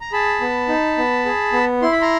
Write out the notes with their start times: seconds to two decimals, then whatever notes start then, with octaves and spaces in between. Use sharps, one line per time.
0.01 A#5
0.12 G#4 A5 B5
0.41 B3
0.68 D#4
0.98 B3
1.26 G#4
1.53 B3
1.82 E4 C6
1.92 B5
2.01 A#5 C6